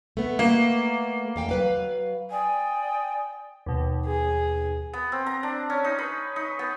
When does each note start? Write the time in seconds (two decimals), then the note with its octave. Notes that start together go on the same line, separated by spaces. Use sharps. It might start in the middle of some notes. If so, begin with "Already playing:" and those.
0.17 A3 B3
0.39 A#3
1.36 E2 F5 G5
1.49 F#3 B4 F5
2.31 D5 G5 G#5 D#6
3.66 D#2 B2
4.06 G#4
4.93 B3
5.12 C4
5.26 A#5
5.43 D4
5.70 C#4
5.85 D#4
5.99 B4
6.36 D#4
6.59 B3